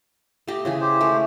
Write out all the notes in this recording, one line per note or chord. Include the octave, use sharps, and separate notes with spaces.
A3 G4 D#5
C#3 E3 G#4
G4 C5
G#3 A3